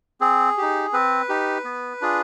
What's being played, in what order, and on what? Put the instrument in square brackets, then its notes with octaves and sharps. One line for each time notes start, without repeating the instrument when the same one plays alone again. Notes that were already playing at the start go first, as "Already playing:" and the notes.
[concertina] C4 G#4
D#4 G4
C4 B4
D#4 G4
B3
D4 F4 G#4